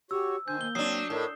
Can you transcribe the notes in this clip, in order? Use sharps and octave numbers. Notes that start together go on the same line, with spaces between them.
F#4 G4 C#5 E6
D#3 D4 C5 G#5 G6
A#3 G7
F#3 C4 D4 D#6 C7
A2 D#4 A4 A#4